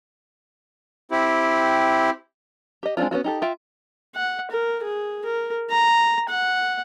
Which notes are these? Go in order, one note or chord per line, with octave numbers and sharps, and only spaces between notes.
C4 E4 G4
G4 D#5
G#3 C4 D4 E4 F4
B3 C#4 F4 F#4
D#4 G4 A4
F4 E5 G5
F#5
A#4
G#4
A#4
A#5
F#5